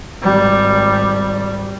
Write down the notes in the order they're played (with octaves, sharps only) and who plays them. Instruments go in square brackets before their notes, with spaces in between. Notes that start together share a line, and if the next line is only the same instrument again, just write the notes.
[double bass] G#1 G3